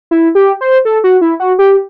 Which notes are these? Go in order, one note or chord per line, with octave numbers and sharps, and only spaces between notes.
E4
G4
C5
A4
F#4
E4
F#4
G4